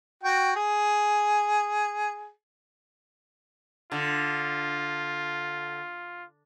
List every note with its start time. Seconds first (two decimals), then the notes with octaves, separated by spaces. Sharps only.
0.23 F#4 G5
0.56 G#4
3.92 D3 F4